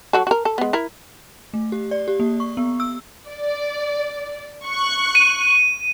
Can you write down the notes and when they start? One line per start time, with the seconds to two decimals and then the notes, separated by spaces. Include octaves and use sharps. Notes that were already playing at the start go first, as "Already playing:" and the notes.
0.13 F#3 F#4 A4
0.27 F#4 A#4
0.45 A4
0.58 G#3 B3
0.73 E4 A#4
1.54 A3
1.72 G4
1.91 D5
2.08 G4
2.20 A#3
2.40 C#6
2.57 B3
2.80 E6
3.28 D5
4.65 C#6 F#6
5.15 D#7